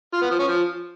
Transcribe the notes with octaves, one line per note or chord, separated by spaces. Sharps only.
F4
B3
F3
C#4
F3